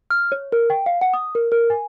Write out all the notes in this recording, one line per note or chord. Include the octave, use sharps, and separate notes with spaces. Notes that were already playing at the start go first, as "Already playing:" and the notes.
F6
C#5
A#4
G5
F5
F#5
D#6
A#4
A#4
G#5